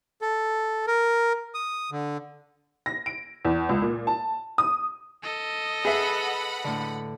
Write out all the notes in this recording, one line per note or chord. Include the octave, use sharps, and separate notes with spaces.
A4
A#4
D#6
D3
A#6
D7
E2
C#2
A#2
A5
D#6
A4 D#5
G#4 B4 E5 F#5 B5
A2 D3